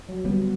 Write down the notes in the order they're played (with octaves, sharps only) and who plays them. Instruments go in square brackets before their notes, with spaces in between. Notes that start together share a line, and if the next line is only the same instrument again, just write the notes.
[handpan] F#3
[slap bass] D3 G3 B3 [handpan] F#3